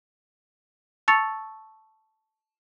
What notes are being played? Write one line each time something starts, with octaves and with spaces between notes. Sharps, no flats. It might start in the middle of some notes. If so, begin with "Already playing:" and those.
A5 C#6 E6 A6 C#7 F7